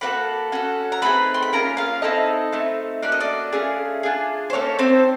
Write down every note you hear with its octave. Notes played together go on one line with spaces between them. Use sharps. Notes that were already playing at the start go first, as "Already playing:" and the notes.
A#3 D#4 F#4 A4 B4 B5
C#4 F#4 A4
A#5
A3 C4 D#4 G#4 B4 B5
C6
B5
A#3 C#4 F4 G#4 A#4 A#5
F4 F5
C4 D#4 E4 A4 D#5
A3 C4 D#4
A#3 C#4 F#4 A4 D5
D#5
D4 D5
A3 C#4 F4 G#4
D4 F4 G#4
C5
A#3 C#4 D#4 A4 C#5
C4 C5